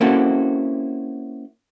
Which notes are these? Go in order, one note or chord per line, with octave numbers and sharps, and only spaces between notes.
A#3 C4 C#4 E4 F#4 A4